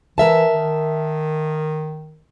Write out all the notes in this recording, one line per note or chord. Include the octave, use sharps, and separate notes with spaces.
E3 A#4 E5 A5
D#3